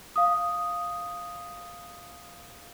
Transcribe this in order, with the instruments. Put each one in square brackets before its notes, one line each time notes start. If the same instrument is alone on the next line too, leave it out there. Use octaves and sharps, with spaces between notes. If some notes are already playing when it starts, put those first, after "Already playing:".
[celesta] F5 D#6